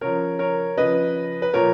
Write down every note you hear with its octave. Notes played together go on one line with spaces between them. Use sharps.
C#3 F3 A#4 C#5
A#4 C#5
C#3 F3 B4 D#5
B4
A#2 F3 A#4 C#5